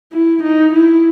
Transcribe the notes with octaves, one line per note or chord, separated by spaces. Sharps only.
E4
D#4
E4